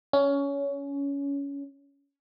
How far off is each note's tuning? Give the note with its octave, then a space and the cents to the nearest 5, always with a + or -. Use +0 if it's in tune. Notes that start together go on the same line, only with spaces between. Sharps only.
C#4 +20